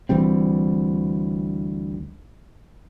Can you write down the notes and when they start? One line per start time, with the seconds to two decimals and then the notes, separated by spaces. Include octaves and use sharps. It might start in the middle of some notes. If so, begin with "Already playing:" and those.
0.09 D2 E3 G3 C4